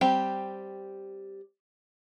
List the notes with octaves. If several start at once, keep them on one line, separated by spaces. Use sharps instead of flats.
G3 C4 G4 G5